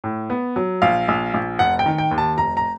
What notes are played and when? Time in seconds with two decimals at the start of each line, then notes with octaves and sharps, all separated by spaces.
0.04 A2
0.30 B3
0.56 F#3
0.82 A#1 F5
1.08 A#1
1.34 A#1
1.59 F1 F#5
1.79 G5
1.86 D#3
1.98 G5
2.11 D#2
2.18 A5
2.38 F1 A#5
2.57 A#5